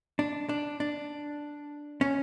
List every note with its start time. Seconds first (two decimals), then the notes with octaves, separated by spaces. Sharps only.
0.19 D4
0.49 D4
0.80 D4
2.01 C#4